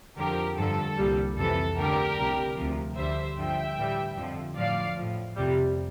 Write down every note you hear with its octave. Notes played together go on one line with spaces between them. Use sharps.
F2 D3 F3 G4 A#4
G2 D3 F3 A4
C2 A#2 G3
F2 C3 E3 A4
D2 D3 G3 G4 A#4
C2 C3 G3
D2 C3 F3
D2 D3 G3 C5 E5
G2 D3 F3 E5 G5
A2 E3 G3
F2 D3 F3
A2 F3 D5 F5
A2 F3
F2 C3 G3